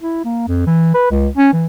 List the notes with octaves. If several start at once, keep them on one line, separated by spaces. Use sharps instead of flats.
E4
A#3
F2
E3
B4
C#2
C#4
E3